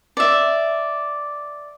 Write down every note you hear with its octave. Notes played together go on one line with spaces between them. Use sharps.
D5 E5